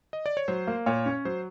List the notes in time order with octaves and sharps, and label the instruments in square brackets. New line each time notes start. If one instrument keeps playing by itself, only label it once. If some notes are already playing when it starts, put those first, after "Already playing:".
[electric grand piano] D#5
D5
C#5
[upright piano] F#3 [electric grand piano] C5
[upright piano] A#3
[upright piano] A#2 [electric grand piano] C#5
[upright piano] C#4
[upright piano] F#3 [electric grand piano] C5